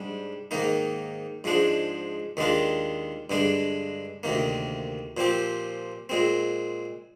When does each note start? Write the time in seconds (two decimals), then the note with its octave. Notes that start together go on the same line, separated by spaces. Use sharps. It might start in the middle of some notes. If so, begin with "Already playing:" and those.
Already playing: G#2 G3 D4
0.51 G#2 D#3 A#3 D#4
1.44 G#2 F3 G#3 D4
2.37 D#2 D#3 G#3 D4 F4
3.30 G2 D3 G#3 D4
4.23 D2 C3 D#3 A#3
5.17 A#2 F3 C4 G4
6.09 A#2 G#3 C4